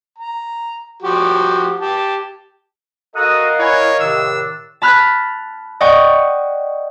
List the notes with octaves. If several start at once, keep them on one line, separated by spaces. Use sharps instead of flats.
A#5
F3 F#4 G4
G4 A5
F#4 A4 A#4 D#5 F5 F#5 A#5 D#6
E4 C#5 G#5
A2 C3 D#3 D4 E6
A5 B5 F6 F#6 G#6
D5 D#5 F#5 G5 C#6